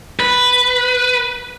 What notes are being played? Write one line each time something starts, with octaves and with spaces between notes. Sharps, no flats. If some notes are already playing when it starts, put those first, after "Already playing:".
B4